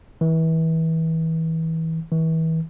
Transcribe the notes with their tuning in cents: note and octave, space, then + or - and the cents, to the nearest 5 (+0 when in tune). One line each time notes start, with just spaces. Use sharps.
E3 -30
E3 -35